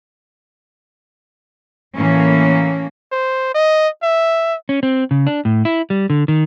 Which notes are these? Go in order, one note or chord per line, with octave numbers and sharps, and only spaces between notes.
A2 E3 A#3 C#4
C5
D#5
E5
C#4
C4
C#3
D4
A2
E4
G3
D3
D#3